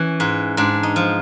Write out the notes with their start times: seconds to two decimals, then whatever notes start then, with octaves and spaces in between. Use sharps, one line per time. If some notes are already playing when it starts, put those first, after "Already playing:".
Already playing: E3 C#4
0.20 G#2
0.57 G#2 D4
0.83 D#4
0.96 F3